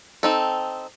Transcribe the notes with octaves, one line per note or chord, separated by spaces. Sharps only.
C4 D#4 A4